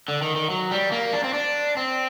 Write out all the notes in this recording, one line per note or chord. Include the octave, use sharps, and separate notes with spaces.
D3
D#3
D#3
F#3
G3
A#3
D4
C4
D4
C4